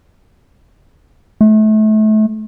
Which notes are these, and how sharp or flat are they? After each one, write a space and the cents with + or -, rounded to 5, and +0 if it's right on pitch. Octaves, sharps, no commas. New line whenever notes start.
A3 -30